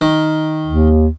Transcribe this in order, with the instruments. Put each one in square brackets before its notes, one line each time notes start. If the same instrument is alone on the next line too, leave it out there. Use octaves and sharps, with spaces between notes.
[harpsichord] D#3
[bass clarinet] D#2